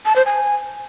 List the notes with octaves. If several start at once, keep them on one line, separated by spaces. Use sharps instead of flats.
A5
C5
G#5